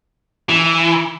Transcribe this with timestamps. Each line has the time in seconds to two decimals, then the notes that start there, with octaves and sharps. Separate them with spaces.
0.49 E3